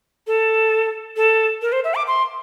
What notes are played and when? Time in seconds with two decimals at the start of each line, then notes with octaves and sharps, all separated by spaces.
0.27 A4
1.17 A4
1.62 A#4
1.72 C5
1.84 E5
1.95 D6
2.07 C6